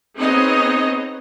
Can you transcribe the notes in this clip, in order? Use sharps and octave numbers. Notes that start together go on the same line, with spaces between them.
B3 C4 D#4 G#4 C#5 D#5